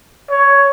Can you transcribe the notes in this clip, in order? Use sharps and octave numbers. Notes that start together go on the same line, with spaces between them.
C#5